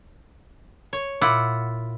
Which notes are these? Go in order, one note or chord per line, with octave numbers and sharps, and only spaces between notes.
C#5
A#2 E4 F4 F#5